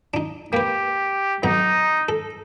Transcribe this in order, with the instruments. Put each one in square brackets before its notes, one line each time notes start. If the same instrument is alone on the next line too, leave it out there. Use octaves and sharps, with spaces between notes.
[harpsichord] D4 D#4
[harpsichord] A#3 B4 [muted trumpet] G4
[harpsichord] B1 B3 A#5 [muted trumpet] D#4
[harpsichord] A4